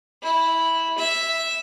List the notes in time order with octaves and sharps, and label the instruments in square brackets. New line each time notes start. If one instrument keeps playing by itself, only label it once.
[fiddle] E4
E5